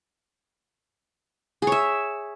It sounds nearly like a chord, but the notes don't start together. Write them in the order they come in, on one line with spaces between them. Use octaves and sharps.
G#4 C#5 E5